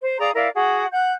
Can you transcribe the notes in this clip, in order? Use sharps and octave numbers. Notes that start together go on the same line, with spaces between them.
C5
G#4 D5 F5 A#5
E4 A#4 D5 F5
F#4 G#4 F#5
F#5 F#6 G6